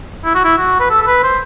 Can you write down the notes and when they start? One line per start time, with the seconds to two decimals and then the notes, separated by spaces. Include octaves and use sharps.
0.25 E4
0.34 F#4
0.44 E4
0.57 F#4
0.79 B4
0.90 A4
1.02 A4
1.07 B4
1.23 C5